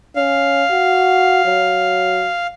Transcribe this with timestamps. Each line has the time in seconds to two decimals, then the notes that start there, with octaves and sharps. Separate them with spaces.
0.16 C#4 F5
0.71 F#4
1.45 F#3